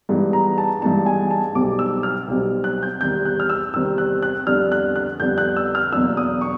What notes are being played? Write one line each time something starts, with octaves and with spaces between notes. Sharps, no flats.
G2 E3 G#3 B3 D#4
A#5
A5
G2 E3 G#3 B3 D#4 A5
G#5
A5
B1 B2 G3 C4 D6
E6
F6
B1 B2 G3 C4
F#6
G6
E2 C3 D#3 G3 C4 G6
F#6
F6
E6
E2 C3 D#3 G3 C4 E6
F#6
F#6
F2 D3 G3 B3 D4 F6
F#6
F#6
F2 D3 G3 B3 D4 G6
F#6
E6
F6
E2 B2 F#3 A#3 D4 E6
D#6
C#6